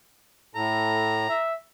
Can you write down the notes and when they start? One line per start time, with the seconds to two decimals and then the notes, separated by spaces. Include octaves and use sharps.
0.55 A2 A4 A#5
1.29 E5